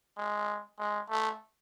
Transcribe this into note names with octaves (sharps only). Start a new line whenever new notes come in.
G#3
G#3
A3